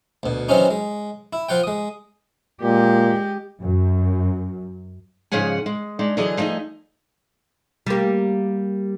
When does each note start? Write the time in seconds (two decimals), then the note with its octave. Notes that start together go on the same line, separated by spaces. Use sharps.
0.23 D2 B2
0.49 D#3 E3 F#3 C4 C#4 D#4
0.70 G#3
1.33 E4
1.49 F3 F4 F#5 G5
1.64 G#3 D#6
2.62 A#2 G#3 G4
3.61 F#2
5.32 G#2 C#3 F3 G#4 F#5 G#5
5.66 G#3
5.99 G#3 D4 D#4
6.17 D3 E3 F#3 G#4 D#5
6.38 F3 A3 D#4 G#4 D#5
7.86 G3 A#3